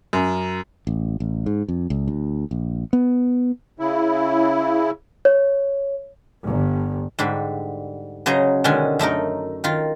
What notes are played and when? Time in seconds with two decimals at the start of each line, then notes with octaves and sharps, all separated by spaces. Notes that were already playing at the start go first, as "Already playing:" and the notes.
0.13 F#2
0.87 A1
1.20 A1
1.46 G#2
1.68 F2
1.90 C#2
2.08 D2
2.51 A#1
2.93 B3
3.79 C#3 E4
5.25 C#5
6.44 G1
7.19 G#2 D3 G3
8.26 C#3 F#3 C5 D#5 A#5
8.64 B2 D3 D#3 G#3 C#4
8.99 F#2 A3 D#4 A#4
9.64 D#3 F4